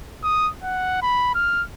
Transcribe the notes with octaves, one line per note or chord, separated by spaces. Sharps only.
D#6
F#5
B5
F6